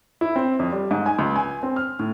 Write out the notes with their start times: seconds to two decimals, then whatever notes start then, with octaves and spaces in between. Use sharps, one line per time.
0.21 E4
0.36 C4
0.59 F2
0.73 G3
0.91 G#2
1.06 G#5
1.19 C#2
1.36 G#5
1.63 C4
1.76 F6
1.99 A2